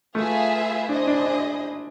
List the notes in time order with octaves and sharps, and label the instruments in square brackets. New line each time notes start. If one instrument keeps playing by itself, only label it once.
[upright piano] A3 [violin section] F4 G#4 B4 E5 G#5
[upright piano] D4 [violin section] E4 G#4 C5 D#5
[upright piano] D4
D4